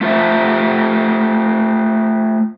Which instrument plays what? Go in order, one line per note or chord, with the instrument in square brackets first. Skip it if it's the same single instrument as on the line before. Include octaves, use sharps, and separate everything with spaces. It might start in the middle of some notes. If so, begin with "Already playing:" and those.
[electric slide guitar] A3 F4 C5 E5